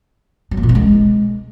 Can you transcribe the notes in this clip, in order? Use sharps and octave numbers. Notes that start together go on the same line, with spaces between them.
F#3
A#3
A#2
B3
G#3